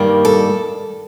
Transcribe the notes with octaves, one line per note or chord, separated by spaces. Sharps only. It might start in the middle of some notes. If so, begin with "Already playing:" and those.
Already playing: G2 D#3 G3 A#3
A4